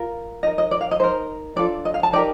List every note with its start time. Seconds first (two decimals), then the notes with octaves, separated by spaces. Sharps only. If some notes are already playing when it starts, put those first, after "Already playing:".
Already playing: F4 A#4
0.43 D#4 A#4 D#5
0.58 D#5
0.71 D5
0.81 F5
0.91 D#5
1.00 D#4 A#4 C5
1.56 D4 F4 A4 D5
1.85 D#5
1.94 F5
2.03 A5
2.13 D#4 G4 A#4 D5